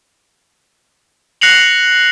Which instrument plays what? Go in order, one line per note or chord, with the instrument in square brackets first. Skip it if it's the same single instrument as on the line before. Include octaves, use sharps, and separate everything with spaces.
[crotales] F#6 A#6 C7 C#7 F7 F#7